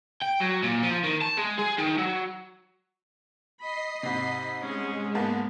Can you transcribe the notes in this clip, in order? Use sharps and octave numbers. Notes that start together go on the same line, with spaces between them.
G5
F#3
A#2
F3
D#3
A5
G#3
G#4
D#3
F#3
D#5 B5 C7
G#2 C3 B5
G#3 C#4 G#4
G#2 A#3 B3 A5